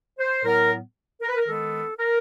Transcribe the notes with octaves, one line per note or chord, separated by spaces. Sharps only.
C5
A2 F#3 B3 A#4
A#4
B4
A#4
D#3 G#3 B3 A4
A#4